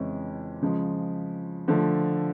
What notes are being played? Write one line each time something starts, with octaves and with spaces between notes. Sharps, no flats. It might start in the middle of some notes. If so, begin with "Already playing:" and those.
Already playing: F2 C#3 E3 G#3 C#4
C#3 F3 G#3
D3 F3 A3